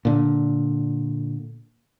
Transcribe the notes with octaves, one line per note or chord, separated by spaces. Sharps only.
A#2 D3